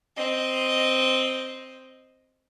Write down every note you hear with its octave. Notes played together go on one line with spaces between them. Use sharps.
C4 D#5